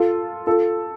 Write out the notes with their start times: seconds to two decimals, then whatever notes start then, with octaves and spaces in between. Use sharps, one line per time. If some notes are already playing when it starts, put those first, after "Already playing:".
Already playing: F4 A4
0.47 F4 A4